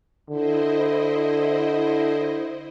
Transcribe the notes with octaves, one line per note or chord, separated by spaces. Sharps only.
D3 E4 C5 D#5